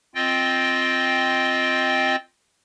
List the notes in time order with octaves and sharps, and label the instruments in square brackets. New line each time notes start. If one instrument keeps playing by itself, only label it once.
[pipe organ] C4 F4 D#5 G5